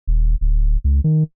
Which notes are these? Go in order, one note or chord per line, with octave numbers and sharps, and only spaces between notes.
D#1
D1
C#2
D#3